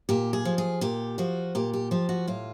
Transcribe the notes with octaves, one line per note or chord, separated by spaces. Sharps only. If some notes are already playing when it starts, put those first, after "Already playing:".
A#2 G4
G#4
F3
G#4
A#2 G4
F3 F#4
A#2 G4
G4
F3 G4
F#4
A2 F4